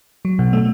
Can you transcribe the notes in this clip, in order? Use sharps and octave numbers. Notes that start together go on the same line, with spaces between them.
F#3
B2
A3